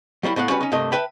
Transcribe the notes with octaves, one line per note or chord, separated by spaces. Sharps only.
F#3 G3 A#3 E4
A2 B3 F5 F#5
G3 C#4 F#4 B4
C#4 D#4
G2 C3 A3 A#3 D#5
B4 E5 G5 A5 B5